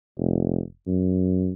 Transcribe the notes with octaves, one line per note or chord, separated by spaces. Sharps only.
F1
F#2